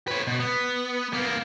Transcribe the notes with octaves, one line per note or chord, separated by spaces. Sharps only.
B4 C#5
B2
B3
A#3 B3